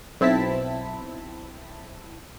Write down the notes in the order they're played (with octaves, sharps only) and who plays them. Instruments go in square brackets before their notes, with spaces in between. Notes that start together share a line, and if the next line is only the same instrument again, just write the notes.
[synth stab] B1 C4 E4 A5 B6